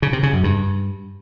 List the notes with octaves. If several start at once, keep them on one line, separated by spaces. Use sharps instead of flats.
C#3
C3
C#3
F#2
G2